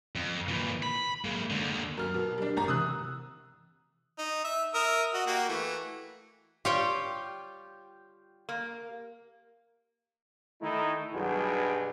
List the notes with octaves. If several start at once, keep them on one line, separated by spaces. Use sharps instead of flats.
F2
A#2 E3
B5
G#3 A#3
D#2 D3
F#2 A#4 F6
B2
G3 D4
G#1 A#5
C3 E3 D#6 E6 F#6
D#4
E5
A#4 E5 D#6
F#4 D#5
A#3 F#4 G4
E3 A3
G3 F4 G4 C#5 G5
A#3
D#3 A3 D#4 E4
B1 G2 B2 F#3 G3 G#4